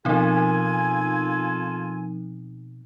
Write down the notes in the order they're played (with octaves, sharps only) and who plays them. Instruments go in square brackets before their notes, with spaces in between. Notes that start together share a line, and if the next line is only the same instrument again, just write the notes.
[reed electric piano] B2 [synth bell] F3 C4 D#4 [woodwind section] F4 A4 G#5